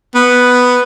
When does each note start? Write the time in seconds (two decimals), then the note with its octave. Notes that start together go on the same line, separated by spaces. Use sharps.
0.15 B3